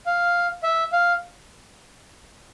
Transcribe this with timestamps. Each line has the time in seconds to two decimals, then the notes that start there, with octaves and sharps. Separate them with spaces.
0.06 F5
0.63 E5
0.93 F5